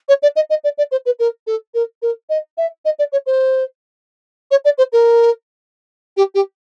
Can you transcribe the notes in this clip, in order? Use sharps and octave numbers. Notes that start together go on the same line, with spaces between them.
C#5
D5
D#5
D#5
D5
D5
C5
B4
A#4
A4
A#4
A#4
D#5
E5
D#5
D5
C#5
C5
C#5
D5
C5
A#4
G4
G4